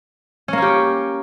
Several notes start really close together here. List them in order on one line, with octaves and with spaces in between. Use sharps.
C#4 A#3 C#5 G4